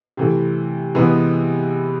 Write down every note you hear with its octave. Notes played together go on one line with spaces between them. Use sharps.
C3 E3 A3
C3 E3 G#3 B3